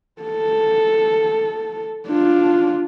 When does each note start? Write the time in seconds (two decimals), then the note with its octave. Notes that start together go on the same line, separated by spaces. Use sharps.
0.22 A4
2.07 D4 F4